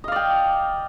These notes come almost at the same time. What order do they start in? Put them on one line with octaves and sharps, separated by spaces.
D#5 F5 D5 G5